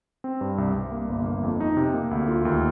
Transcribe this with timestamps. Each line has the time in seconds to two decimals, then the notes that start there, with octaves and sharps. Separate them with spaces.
0.24 C4
0.41 G2
0.58 C2
0.75 C2
0.92 A#3
1.09 G1
1.26 A#3
1.43 F2
1.60 D#4
1.77 C3
1.94 A#3
2.11 D2
2.28 F4
2.45 D#2